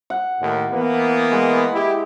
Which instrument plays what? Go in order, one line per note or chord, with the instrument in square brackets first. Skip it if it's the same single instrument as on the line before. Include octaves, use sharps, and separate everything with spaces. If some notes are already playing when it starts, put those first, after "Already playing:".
[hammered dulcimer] F#5
[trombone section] D#2 A2
E3 A#3 B3
[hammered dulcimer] G#3
[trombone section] E4 G4